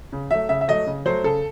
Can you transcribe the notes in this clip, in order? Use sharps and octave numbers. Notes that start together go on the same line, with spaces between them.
C#3
F#3 A3 E5
C#3 E5
E5
F#3 A3 D#5
C#3
F#3 A3 C5
C#3 A4